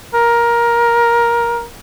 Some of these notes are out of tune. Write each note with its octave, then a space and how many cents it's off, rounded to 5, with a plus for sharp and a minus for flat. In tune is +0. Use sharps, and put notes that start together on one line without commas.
A#4 +15